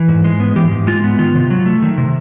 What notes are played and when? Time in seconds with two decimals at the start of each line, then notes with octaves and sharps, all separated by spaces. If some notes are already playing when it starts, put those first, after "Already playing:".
Already playing: E3
0.08 G#2
0.24 G#3
0.40 B3
0.56 E3 G4
0.71 G#2
0.87 G#3 F4
1.04 B3
1.19 D#3 F4
1.35 C3
1.50 F#3
1.66 A3
1.82 D#3
1.98 C3